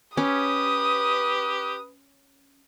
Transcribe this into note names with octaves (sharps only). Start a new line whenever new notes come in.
C#4 G4 B4 D#6